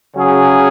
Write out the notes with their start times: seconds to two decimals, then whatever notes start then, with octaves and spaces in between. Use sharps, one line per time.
0.15 C#3 F#3 C#4 G#4